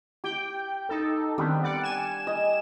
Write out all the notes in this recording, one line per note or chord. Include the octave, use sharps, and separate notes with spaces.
G4 G5
D#4 A4
D#3 G3 B3 C4 D4
D5 F#5
G#5 E7
D#5